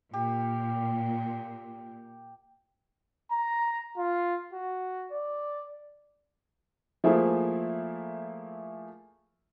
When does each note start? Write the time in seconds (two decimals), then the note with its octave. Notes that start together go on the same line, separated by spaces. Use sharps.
0.13 A#2 G4
3.31 A#5
3.97 F4
4.53 F#4
5.12 D5
7.04 F3 A3 A#3 E4 G#4